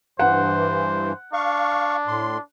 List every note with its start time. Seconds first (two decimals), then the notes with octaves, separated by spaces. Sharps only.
0.19 G2 E3 C5 F#5
1.33 D4 F5 C#6
2.07 A2 C6